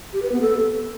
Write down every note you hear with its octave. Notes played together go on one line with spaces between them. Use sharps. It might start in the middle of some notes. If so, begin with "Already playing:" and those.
G4
B4
B3
A4